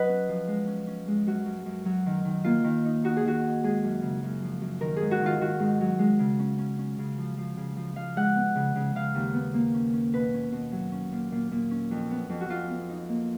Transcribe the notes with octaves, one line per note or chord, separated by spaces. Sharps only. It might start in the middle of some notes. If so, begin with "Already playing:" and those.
Already playing: F#3 B4 D#5 F#5
C#4
F3
G#3
C#4
C#4
G#3
F#2 F#4
F#2
F#2
F#3
D#3
D#3
A#3 F4
D#3
D#4
D#4 F#4
G#4
D#3 F#4
D#4
G#3 G#4
F#2
C#3
F#2
F3
F#2
D#3 A#4
G#4
G#2
F#4
D#3 F4
D#3 F#4
G#2
F#3
G#3
C#3
C#4
C#4
C#4
C#3
F3
F3
C#3
F3
F3 F5
G#3 F#5
B3
C#3
C#3
C#3 F5
D#2
B3
A#3
C#4
C#4
B2 B4
C#4
B2
F#3
C#4
A#2
A#2
A#2
C#4
F2
B3
F2
F#4
F2 F4
B3
D#4
A#3